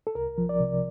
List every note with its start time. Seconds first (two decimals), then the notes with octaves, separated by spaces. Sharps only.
0.07 A4
0.15 C2 A#4
0.38 F3
0.49 D5
0.60 C3